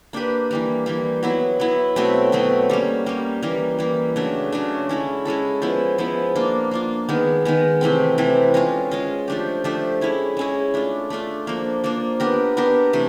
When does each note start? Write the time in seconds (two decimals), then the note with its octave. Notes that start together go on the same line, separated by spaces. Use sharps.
0.13 A#3 D4 G4 B4
0.51 E3 G3 A#3
0.86 E3 G3 A#3
1.23 F#3 B3 E4
1.60 F#3 B3 E4
1.96 B2 F#3 A3 C4
2.32 B2 F#3 A3 C4
2.70 G3 A#3 C#4
3.06 G3 A#3 C#4
3.43 E3 G3 A#3
3.79 E3 G3 A#3
4.16 C#3 F#3 A3 D4
4.52 C#3 F#3 A3 D4
4.89 G#3 C#4 E4 A4
5.25 G#3 C#4 E4 A4
5.62 F3 G#3 B3 E4
5.98 F3 G#3 B3 E4
6.35 A#3 D4 F4
6.71 A#3 D4 F4
7.09 D#3 G#3 B3
7.45 D#3 G#3 B3
7.81 C3 E3 A3 C4
8.18 C3 E3 A3 C4
8.54 G#3 C#4 F4 G#4
8.91 G#3 C#4 F4 G#4
9.28 F3 A3 D4 G4
9.64 F3 A3 D4 G4
10.01 G#3 C#4 E4 G#4
10.37 G#3 C#4 E4 G#4
10.74 A3 D4 F4
11.10 A3 D4 F4
11.47 F3 A#3 D4
11.84 F3 A#3 D4
12.20 B3 D4 G4 A#4
12.57 B3 D4 G4 A#4
12.93 C3 E3 A3